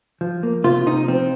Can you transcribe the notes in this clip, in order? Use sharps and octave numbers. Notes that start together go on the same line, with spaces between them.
F3
A#3
C3 F4
C3 D#4
F3 C4